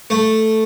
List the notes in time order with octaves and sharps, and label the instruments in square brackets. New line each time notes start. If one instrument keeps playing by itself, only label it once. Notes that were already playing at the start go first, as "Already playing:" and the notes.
[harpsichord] A3